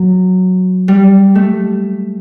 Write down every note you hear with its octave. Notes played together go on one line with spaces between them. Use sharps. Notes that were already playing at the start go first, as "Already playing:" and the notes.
Already playing: F#3
G3
A3